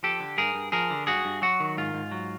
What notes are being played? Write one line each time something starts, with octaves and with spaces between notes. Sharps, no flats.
F3 G4 A4
D3
G2 G#4 A#4
G2
F3 G#4 A#4
D3
G2 F#4 G#4
G2
F#3 F#4
D#3
G#2 F4
G#2
F#3